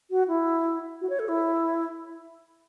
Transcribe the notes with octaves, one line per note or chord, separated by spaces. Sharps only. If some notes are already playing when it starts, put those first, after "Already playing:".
F#4
E4
F#4
C#5
A4
E4